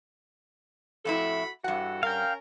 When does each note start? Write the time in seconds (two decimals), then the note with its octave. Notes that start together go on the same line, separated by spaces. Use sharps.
1.05 F2 A2 E4 F#4 A4 B5
1.64 G2 E3 F#4 A4 F#5
2.03 C#4 A#4 F5 G5